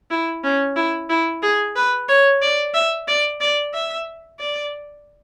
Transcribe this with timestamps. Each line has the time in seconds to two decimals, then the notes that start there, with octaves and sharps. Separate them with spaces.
0.10 E4
0.43 C#4
0.76 E4
1.09 E4
1.42 G#4
1.76 B4
2.09 C#5
2.42 D5
2.74 E5
3.08 D5
3.41 D5
3.74 E5
4.39 D5